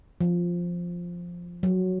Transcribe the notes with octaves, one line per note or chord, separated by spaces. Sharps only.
F3
F#3